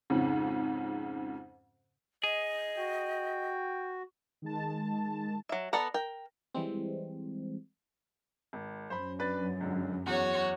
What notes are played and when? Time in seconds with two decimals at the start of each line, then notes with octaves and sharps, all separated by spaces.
0.10 F2 G#2 C#3
2.24 G#4 D#5
2.77 F#4 G5
4.42 D#3 G#3 A5
5.49 F#3 E5
5.73 B3 A4 D5 F#5 A#5
5.94 A#4 G5
6.55 E3 G3 G#3 C4
8.53 G#1
8.90 F#2 C5 B5
9.19 D4 B4 A6
9.61 C#2 D3
10.06 E2 F#4 C#5